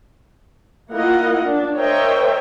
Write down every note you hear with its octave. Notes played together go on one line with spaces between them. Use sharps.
A#3 E4 F4 A#4 D#5 F#5
D4
A#4 C5 C#5 D#5 E5 G5